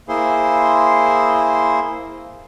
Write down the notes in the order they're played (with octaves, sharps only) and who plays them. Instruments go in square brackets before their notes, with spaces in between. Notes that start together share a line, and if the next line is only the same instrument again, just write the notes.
[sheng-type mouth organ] A#3 E4 G#4 C5 C6